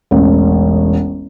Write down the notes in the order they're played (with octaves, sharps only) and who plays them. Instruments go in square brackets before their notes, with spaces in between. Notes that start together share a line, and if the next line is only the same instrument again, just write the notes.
[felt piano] E1 A1